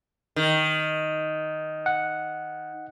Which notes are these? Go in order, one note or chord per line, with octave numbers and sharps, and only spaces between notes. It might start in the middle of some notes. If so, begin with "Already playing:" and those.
D#3
F#5